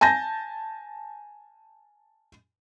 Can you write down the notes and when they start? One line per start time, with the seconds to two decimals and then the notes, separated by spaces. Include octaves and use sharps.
0.01 G#5 A5 G6 A#6